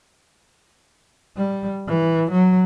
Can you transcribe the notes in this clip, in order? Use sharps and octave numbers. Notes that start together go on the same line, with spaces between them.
G3
E3
F#3